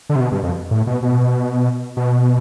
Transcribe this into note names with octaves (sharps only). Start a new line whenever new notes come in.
D3
C3
B2
G2
F2
A2
B2
B2
B2